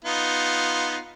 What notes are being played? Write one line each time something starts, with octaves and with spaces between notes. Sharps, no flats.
B3 D#4 F4